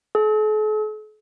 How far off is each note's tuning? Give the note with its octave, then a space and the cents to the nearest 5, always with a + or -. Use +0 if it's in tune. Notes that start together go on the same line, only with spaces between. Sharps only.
A4 -45